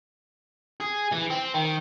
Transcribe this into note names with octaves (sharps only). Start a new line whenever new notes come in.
G#4
E3
C4
D#3